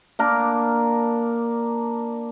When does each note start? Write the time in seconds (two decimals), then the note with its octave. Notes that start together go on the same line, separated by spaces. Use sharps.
0.19 A#3 D4 A#4